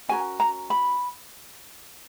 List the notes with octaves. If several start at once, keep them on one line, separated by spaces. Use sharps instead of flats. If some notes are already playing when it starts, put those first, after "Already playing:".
C#4 F#4 A#4 G#5
A#5
B5